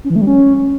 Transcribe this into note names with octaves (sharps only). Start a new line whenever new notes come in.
C#4
E3
A3
G3
C#4